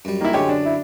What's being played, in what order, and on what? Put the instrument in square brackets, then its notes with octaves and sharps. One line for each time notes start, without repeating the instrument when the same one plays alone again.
[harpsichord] F#2 G3
[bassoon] D#3 [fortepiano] A#3 E4
[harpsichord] F#2 D3 [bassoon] G#3 [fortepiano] G4 C#5
[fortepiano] D4
[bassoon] E4